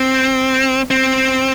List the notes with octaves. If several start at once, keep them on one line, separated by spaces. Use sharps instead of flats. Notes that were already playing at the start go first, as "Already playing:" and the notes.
Already playing: C4
C4